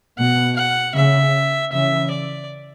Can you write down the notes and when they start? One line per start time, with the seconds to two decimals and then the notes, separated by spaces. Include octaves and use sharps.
0.18 B2 F#5
0.56 F#5
0.95 C#3 E5
1.72 C#3 E3 E5
2.11 D5